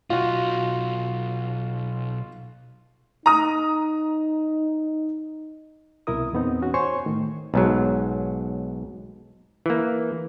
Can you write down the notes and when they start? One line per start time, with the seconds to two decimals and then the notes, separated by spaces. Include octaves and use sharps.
0.10 B1 D#4 F4 F#4
3.26 D#4 A#5 D#6
6.07 C2 B2 E4 A#4 D#6
6.33 E2 A#2 B3 C4 D#4
6.62 C#4 F#4
6.74 C5 C#5 G#5 C6 C#6
7.06 A2 D#3 A3
7.54 B1 G#2 F#3
9.66 E3 A#3